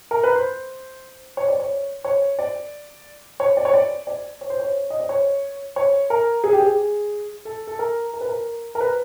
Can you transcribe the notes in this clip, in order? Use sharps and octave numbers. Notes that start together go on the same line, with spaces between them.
A#4
B4
C5
C#5
D5
C#5
C#5
D5
C#5
D5
C#5
D5
D5
C#5
C5
C#5
D#5
D5
C#5
C#5
A#4
G#4
G4
G#4
A4
A4
A#4
A#4
B4
A#4
A#4
B4